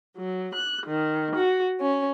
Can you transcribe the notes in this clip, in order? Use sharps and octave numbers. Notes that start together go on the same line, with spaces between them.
F#3
F#6
D#3
F#4
C#4